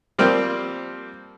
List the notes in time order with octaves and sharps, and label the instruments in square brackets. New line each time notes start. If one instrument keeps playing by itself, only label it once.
[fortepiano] F3 G3 A#3 C4